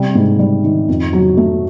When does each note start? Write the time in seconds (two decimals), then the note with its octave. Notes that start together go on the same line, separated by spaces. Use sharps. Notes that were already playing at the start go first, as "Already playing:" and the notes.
Already playing: C3 G3
0.15 G#2
0.39 G3
0.64 D#3
0.89 F2
1.13 F#3
1.37 A3